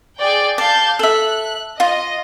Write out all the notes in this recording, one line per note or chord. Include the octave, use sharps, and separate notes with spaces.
G#4 D5 G5
D5 F5 A5 G6
A4 E5 F#6
F4 D#5